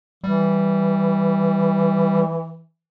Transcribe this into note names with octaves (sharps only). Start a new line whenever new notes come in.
E3 G3